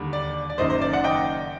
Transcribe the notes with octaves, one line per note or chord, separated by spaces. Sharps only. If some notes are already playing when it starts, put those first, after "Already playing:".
Already playing: D#2 D3 G3
D5
D5
F#1 F#2 D#3 C5 D#5
C5
D5
D5 F#5
D#5 G5